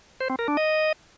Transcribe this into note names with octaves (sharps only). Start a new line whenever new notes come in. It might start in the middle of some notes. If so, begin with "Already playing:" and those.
C5
C4
A#4
D4
D#5